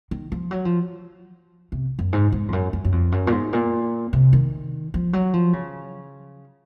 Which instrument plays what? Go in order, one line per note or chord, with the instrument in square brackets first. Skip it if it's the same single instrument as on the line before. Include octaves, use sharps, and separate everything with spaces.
[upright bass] D#3
F3
F#3
F3
C3
F#2
G#2
G#2
F2
F#2
F#2
F#2
F2
F#2
A#2
G#2
A#2
C3
D#3
F3
F#3
F3
C#3